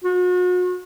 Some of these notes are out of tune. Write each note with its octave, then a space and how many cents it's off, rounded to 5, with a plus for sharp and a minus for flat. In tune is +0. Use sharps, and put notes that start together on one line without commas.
F#4 -40